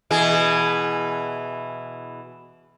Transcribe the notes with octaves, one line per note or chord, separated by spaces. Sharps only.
B2 E3 G#4